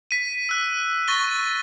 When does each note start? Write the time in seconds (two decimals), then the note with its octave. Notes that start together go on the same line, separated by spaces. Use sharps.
0.11 B6 D#7
0.49 E6 F#6
1.08 C#6 A6 A#6 D#7 G7